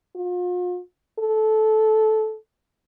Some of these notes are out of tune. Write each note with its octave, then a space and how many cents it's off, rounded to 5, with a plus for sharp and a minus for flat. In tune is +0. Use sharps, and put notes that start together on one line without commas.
F4 +40
A4 -15